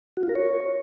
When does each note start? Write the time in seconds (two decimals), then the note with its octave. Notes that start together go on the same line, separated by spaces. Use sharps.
0.17 F#4
0.23 F4
0.29 A#4
0.35 C#5